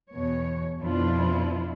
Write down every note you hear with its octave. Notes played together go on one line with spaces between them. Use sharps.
E2 B2 C#5
F2 B2 D4 E4 F4